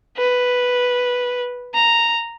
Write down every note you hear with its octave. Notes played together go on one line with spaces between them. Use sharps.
B4
A#5